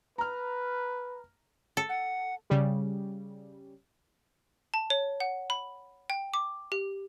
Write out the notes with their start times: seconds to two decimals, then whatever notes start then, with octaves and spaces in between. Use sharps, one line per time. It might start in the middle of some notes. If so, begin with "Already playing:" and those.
0.18 B4 A#5 F6
1.77 A4
1.89 F#5
2.50 C#3 G3
4.74 A5
4.90 C#5
5.20 F#5
5.50 B5
6.10 G5
6.34 D6
6.72 G4